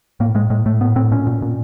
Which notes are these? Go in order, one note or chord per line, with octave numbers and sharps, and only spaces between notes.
A2 A#3
A2 G#3
A2 G#3
A2 A3
A2 B3
A2 C4
A#2 C#4
A#2
A#2